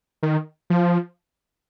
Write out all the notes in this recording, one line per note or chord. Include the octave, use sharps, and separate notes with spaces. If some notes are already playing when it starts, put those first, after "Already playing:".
D#3
F3